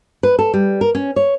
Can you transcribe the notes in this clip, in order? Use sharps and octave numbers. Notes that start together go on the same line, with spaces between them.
B4
A4
G3
A#4
C#4
C#5